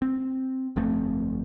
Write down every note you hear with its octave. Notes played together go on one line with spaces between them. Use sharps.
C4
G1 F2 A3 C4